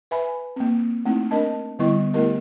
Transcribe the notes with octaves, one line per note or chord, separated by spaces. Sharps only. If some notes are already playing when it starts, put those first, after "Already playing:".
B4 E5 G#5 B5
A#3 C4
A3 C4 D#4 E4
D4 A#4 D#5 A5
D3 G3 B3 E4 D#5 C#6
A3 B3 E4 G4 A#4 D#5